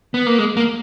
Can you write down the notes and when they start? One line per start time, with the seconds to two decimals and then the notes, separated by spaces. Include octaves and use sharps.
0.14 B3
0.27 A#3
0.38 G#3
0.57 A#3